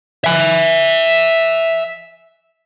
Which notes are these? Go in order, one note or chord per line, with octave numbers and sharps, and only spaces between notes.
E5 G#5